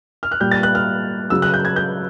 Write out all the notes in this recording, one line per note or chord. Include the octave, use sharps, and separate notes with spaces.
F6
F#6
A#2 G3 G6
A6
F#6
F6
C#3 F#3 E6
F#6
G6
G#6
G6